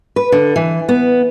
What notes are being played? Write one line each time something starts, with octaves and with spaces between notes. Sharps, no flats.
B4
D3
E3
B3